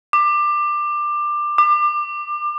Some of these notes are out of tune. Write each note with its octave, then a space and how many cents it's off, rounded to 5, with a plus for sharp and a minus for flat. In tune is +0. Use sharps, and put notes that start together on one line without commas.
D6 +20
D6 +30